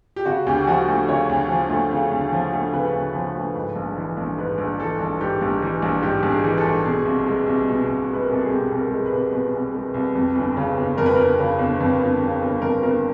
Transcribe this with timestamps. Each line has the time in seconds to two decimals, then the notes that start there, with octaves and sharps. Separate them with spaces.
0.16 G4
0.26 C#3 F#4
0.46 D2 G4
0.67 F3 F#4
0.88 A3
1.08 C#3 C#5
1.29 D2
1.49 F3
1.69 A3
1.91 C#3
2.12 D2
2.32 F3
2.53 A3
2.73 C#3 B4
2.93 D2
3.15 F3
3.35 A3
3.55 G#2
3.76 A#1
3.97 E3
4.17 A#1
4.38 G#2 B4
4.58 A#1
4.79 E3 A4
5.00 A#1
5.20 G#2 G4
5.41 A#1
5.62 E3
5.82 A#1
6.02 G#2 G4
6.23 A#1
6.30 G#4
6.44 E3
6.58 A4
6.64 A#1
6.85 B2 G#4
7.05 C2
7.26 G#3
7.46 C2
7.68 B2
7.89 C2
8.09 G#3 B4
8.23 A#4
8.30 C2 A4
8.41 G#4
8.50 B2 G4
8.71 C2
8.78 A#4
8.92 G#3
9.06 B4
9.12 C2
9.33 B2 B4
9.53 C2
9.74 G#3
9.94 C2
10.15 F2
10.35 G1
10.57 C#3
10.77 G1
10.98 F2 A#4
11.06 B4
11.16 G1 A#4
11.39 C#3
11.59 G1
11.80 F2
12.01 G1
12.21 C#3
12.42 G1
12.62 F2 A#4
12.83 G1 A#4